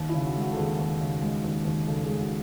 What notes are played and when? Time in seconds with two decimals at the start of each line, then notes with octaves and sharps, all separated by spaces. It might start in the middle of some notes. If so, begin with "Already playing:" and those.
Already playing: D#2
0.09 E4
0.14 C#3
0.25 F#4
0.36 G#3 F#4
0.53 A4
0.57 D#2 G#4
0.79 D#2
1.01 C#3
1.22 G#3
1.44 D#2
1.65 D#2
1.87 C#3 A4
2.04 G#4
2.09 G#3
2.20 F#4